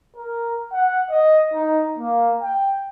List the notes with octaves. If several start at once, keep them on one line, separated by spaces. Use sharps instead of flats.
A#4
F#5
D#5
D#4
A#3
G5